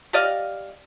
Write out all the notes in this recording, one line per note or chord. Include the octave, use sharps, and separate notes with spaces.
G4 D5 D#5 F5